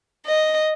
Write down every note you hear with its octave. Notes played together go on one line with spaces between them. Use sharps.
D#5